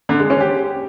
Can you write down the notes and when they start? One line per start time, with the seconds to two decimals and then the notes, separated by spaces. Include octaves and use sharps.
0.09 D3
0.20 G#3
0.30 C#4
0.40 G4